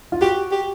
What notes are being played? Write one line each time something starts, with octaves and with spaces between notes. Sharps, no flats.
F4
F#4 G4
G4